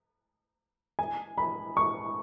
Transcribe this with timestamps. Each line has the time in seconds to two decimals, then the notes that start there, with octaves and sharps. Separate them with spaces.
0.99 G#5
1.38 B5
1.77 C#6